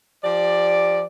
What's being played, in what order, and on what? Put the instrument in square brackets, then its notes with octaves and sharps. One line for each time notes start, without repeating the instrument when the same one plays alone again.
[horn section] F3 G4 D5